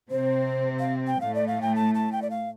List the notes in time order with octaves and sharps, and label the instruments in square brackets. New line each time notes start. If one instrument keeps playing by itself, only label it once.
[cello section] C3 C4 [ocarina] C5
[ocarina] F5
G5
[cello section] A2 A3 [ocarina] F5
[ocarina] D5
F5
G5
A5
A5
G5
D5
F5